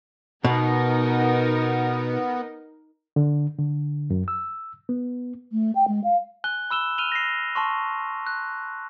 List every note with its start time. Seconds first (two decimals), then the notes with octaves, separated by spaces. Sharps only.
0.44 B2 B3 D#4 A#4
3.16 D3
3.58 D3
4.10 F#2
4.28 E6
4.89 B3
5.52 A3
5.75 G5
5.88 G#3
6.04 F5
6.44 G#5 F#6 G7
6.70 B5 E6 E7 G7
6.98 F6 D#7 F7 G7
7.12 A#6 C7
7.55 A5 C6 C#6
8.27 F#6